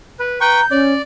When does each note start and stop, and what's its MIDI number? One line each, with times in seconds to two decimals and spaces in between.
0.19 0.41 71
0.41 0.61 71
0.41 0.61 79
0.41 0.65 82
0.41 0.61 85
0.41 0.81 91
0.71 0.94 61
0.71 0.93 73
0.71 1.02 74